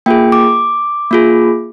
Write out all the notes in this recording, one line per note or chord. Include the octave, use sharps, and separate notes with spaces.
A#3 F4 G#4 G5
D6
A#3 F4 G#4